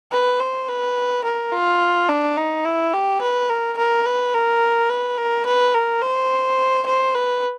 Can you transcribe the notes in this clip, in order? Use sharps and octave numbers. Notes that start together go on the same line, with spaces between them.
B4
C5
B4
A#4
F4
D4
D#4
E4
G4
B4
A#4
A#4
B4
A#4
B4
A#4
B4
A#4
C5
C5
B4